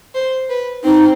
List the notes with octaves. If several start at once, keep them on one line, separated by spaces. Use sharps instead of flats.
C5
B4
C4 D#4